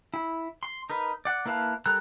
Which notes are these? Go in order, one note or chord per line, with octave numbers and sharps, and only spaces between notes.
E4
C6
D#4 A#4 B4
D5 F#5
A#3 E4 B4 F5 A5
G3 A4 A#4 A#5 F#6